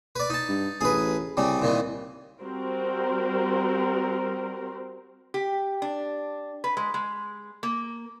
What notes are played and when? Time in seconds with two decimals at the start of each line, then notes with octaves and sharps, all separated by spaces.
0.16 B4 D5
0.30 D#4 A5
0.49 G2
0.81 A1 G#4 B4
1.37 C2 C#3 G3
1.62 A#2 D#3 E3
2.42 G3 C4 F#4 A#4 C5
5.34 G4
5.82 D4
6.64 B4
6.77 G#3
6.94 G#3
7.63 A#3